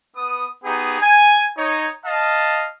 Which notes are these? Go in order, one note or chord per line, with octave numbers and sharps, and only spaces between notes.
B3 D#6
B3 D#4 G4 G#4
G#5
D#4 C#5
D#5 F5 A5